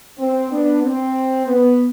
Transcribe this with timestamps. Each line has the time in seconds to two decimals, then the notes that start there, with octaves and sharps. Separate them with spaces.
0.18 C4
0.50 B3 D4
0.82 C4
1.46 B3